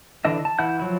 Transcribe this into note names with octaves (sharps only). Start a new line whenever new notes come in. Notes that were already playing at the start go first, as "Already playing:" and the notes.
D3 E3 D4 D#5 E5
A5
E3 E4 F#5 G6
F3 F#3 E4